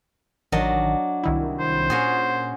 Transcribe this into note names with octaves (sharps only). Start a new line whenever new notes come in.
A1 D#3 F#3 D4 D#5
C2 D#3 E4
C5
A#2 C#4 F#4 G#4